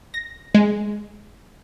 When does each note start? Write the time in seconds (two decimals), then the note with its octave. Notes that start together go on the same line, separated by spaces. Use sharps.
0.14 A#6
0.54 G#3